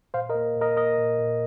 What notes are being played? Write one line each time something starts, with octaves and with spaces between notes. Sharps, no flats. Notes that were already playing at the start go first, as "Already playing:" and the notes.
A#2 C5 F5
A#4 D#5
A#3
A#2
A#4 D#5
A#3 A#4 D#5
A#2
A#2